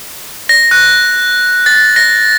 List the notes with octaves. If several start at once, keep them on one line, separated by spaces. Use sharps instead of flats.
A#6
F#6
A6
A#6